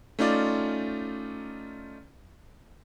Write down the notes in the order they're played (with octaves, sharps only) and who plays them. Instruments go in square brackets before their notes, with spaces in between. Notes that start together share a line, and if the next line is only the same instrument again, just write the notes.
[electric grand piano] A3 C#4 D#4 F4 D5